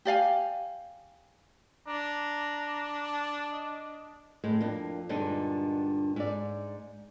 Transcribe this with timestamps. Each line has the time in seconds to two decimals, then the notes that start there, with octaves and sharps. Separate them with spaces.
0.05 G4 D5 F5 G#5
1.88 D4 A#5
3.14 A5
3.52 D#5
4.44 A2 G#3 C4
4.61 F2 A#3 D4
5.09 G2 A#2 D3 G#3 D4 D#4
6.16 G#2 D5